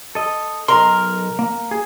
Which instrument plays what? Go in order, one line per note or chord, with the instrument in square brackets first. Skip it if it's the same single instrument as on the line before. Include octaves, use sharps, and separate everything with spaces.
[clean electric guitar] A4 D#5
[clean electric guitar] B1 D#5 C6 [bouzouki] A#4
[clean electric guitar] A#3
G#4